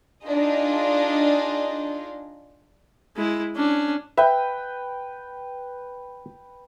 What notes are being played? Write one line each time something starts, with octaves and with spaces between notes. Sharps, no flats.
D4 D#4 F4 G#4 D#5
G#3 E4
C#4 D4
B4 E5 G5